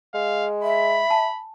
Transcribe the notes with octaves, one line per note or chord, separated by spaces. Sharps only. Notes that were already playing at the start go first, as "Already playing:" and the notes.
G#3 F5
E5 B5
G#5 A5